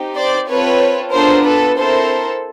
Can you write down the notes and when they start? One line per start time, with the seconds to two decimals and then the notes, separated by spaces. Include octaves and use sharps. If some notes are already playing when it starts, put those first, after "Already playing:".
Already playing: C4 D#4 G4
0.16 C5 D5
0.49 C4 F4 A4 B4 C#5
1.13 B3 D4 F4 A4 A#4 C5
1.45 A4 B4
1.77 C4 E4 A4 A#4 C5